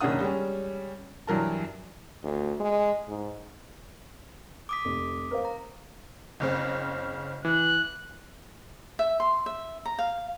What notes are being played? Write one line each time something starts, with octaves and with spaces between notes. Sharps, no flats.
F#1 D#3 C#4 D4 F#5 D#6
G3 G#3 C#4
G2 E3 F#3 A#4 A5
D2
G#3
G#2
D6 D#6 B6
F1
A#4 C5 F5
A#5
F#1 C#3 C4
E3 F#6
E5
C6
E5
A#5
F5